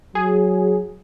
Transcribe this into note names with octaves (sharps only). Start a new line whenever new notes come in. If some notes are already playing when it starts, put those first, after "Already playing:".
F#3 G#4